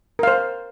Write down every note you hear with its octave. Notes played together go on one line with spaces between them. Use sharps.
A#4 C5 F5